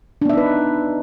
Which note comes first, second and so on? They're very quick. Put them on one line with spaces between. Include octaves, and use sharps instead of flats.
D4 B3 E5 D#4 B4